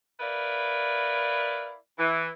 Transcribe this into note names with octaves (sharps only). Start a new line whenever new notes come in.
E4 A#4 B4 D5 F5
E3